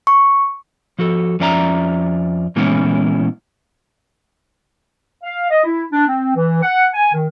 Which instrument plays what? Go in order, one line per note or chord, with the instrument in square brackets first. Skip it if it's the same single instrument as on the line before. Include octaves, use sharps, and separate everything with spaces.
[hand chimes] C#6
[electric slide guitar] F3 F#4 A4
F2 F3 C#4 D5 E5 A#5
A#2 E3 G#3 B3 C#4 E4
[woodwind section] F5
D#5
E4
D4
C4
E3
F#5
G#5
D#3